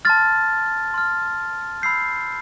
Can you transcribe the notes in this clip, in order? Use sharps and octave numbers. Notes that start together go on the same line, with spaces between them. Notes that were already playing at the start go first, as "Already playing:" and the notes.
A5 C6 F6 A6
C6 F6
B5 E6 G6 C7